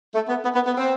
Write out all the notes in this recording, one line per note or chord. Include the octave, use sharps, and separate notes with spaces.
A3
B3
B3
B3
B3
C4